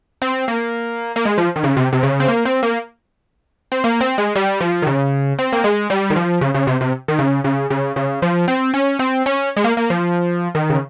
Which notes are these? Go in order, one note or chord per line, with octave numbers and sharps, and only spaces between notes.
C4
A#3
A#3
G#3
F3
D#3
C#3
C3
C3
C#3
C4
A#3
C4
A#3
C4
A#3
C4
G#3
G3
F3
D#3
C#3
C4
A#3
G#3
G3
D#3
F3
C#3
C#3
C3
C3
D#3
C#3
C#3
C#3
C#3
F3
C4
C#4
C4
C#4
G#3
A#3
A#3
F3
D#3
C#3